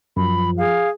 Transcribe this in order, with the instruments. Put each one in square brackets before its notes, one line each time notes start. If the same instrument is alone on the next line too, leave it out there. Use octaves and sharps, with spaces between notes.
[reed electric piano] F#2 [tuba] F3 [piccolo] B5
[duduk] G#4 [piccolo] F5